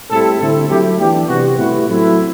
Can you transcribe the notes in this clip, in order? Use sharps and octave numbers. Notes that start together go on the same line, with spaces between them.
A2 G3 C4 E4 A4
D3 A3 C4 E4 A4
F#3 A3 E4 G4
E3 B3 D4 G4
C3 E3 G3 C4 F#4
A2 G3 B3 E4 F#4
F#3 A3 C4 E4